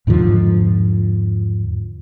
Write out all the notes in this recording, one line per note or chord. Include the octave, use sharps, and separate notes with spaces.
E2 G#2 D3 F3